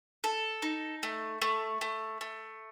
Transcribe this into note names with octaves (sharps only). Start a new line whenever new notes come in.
A4
D#4
A3
A3
A3
A3